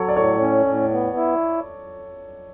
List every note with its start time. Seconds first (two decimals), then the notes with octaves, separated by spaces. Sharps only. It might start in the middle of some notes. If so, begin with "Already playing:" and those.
Already playing: F#3 A4 C#5
0.09 D5
0.16 A2 A4 C#5
0.41 C#4
0.67 A2
0.91 B3
1.17 E4